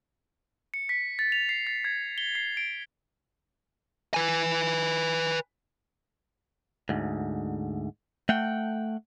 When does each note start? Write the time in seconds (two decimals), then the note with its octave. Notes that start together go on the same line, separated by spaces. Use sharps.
0.74 C#7
0.89 B6
1.19 A6
1.32 F7
1.49 C7
1.67 A6
1.85 G#6
2.18 G7
2.35 C7
2.57 D7
4.14 B4 G#5
6.89 D2 G#2
8.29 A3 F#5 G5